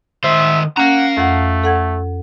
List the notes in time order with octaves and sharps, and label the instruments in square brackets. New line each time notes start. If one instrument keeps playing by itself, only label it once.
[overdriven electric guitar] D#3 C5 [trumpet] E5
[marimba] C#4 [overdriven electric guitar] F5 A#5 [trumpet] F#5
[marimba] F2 F#5 [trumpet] A3
[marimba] A4 F#5 G#6